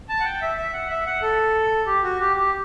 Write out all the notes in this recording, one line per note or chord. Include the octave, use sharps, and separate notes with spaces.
A5
F#5
G5
E5
E5
F#5
E5
F#5
A4
G4
F#4
G4
G4